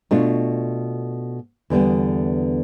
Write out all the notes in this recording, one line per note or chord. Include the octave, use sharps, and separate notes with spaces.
B2 A3 D4 F4
E2 D3 G3 B3